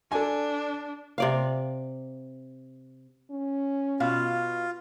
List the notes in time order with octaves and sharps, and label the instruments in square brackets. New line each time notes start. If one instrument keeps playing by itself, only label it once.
[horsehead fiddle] D4 [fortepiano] A4 G#5
[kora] C3 D5 F5
[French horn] C#4
[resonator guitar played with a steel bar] B2 F5 [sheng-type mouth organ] F4